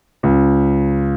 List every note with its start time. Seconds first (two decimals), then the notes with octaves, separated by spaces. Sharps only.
0.23 C#2